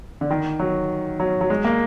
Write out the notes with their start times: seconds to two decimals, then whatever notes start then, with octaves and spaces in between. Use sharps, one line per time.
0.21 D3
0.31 D#3
0.59 F#3
1.20 F#3
1.41 F#3
1.50 G#3
1.65 A#3